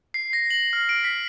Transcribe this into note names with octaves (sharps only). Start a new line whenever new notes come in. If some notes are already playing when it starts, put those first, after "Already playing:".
C7
A#6
F#7
F6
D7
B6